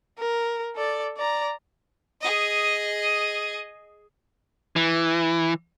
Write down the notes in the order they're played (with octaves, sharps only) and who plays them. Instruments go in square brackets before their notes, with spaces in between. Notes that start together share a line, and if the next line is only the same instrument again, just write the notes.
[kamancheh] A#4
A4 D5
D5 A#5
[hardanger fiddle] G#4 D#5
[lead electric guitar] E3